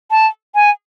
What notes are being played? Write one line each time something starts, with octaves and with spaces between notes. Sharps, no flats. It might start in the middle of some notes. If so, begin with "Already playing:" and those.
A5
G#5